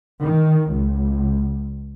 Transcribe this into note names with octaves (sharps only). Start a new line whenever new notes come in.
D#3
C#2